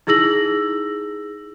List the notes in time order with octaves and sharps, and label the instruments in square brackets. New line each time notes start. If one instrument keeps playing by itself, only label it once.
[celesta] D#4 E4 G#4 E6 A#6 F#7